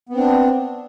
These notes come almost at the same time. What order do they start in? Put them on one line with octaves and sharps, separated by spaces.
B3 C4 D4